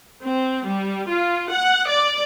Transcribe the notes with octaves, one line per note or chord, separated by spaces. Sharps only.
C4
G3
F4
F#5
D5